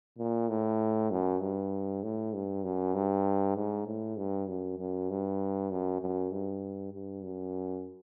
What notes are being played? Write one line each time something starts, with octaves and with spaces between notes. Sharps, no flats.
A#2
A2
F#2
G2
A2
G2
F#2
G2
G#2
A2
G2
F#2
F#2
G2
F#2
F#2
G2
G2
F#2